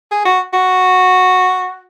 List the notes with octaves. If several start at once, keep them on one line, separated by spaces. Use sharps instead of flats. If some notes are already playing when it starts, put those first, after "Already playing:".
G#4
F#4
F#4